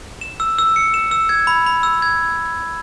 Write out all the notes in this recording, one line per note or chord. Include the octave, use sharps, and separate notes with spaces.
E7
E6
E6
C#7
E7
E6
G#6
B5
B5
E6
G#6